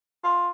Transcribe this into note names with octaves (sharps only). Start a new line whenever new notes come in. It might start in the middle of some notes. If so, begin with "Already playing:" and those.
F4